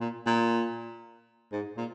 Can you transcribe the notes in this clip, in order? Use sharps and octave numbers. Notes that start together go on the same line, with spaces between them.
A#2
A#2
G#2
A#2